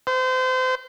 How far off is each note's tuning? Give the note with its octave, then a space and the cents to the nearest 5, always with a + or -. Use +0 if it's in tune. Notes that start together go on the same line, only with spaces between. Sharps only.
C5 -30